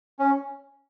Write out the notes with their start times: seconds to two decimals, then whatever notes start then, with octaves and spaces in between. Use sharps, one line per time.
0.19 C#4